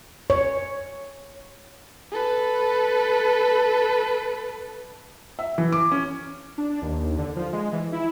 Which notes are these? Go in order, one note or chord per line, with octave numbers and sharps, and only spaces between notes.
C#5
A4 B4
E5
E3
D6
C#4
D4
D#2
D3
F3
G#3
E3
E4